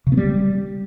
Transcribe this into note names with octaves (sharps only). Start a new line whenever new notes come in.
C#3
B3
G3